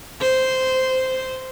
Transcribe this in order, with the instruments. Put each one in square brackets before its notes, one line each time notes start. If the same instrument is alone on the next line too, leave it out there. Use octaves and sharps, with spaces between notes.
[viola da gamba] C5